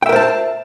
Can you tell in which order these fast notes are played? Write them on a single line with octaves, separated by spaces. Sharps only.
G5 E5 A#4 C5 A5